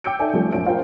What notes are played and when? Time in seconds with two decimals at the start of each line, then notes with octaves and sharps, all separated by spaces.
0.04 G5 D6 E6 G6 C#7 D7
0.20 D#4 A4 D5 E5 G#5
0.33 F3 G3 A3 C#4
0.53 A#1 F#2 C#4 D7
0.66 F4 A#4 C5 G5